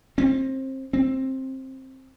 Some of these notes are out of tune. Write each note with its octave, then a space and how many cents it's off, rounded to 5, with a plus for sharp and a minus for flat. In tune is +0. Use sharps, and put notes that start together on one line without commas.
C4 +25
C4 +15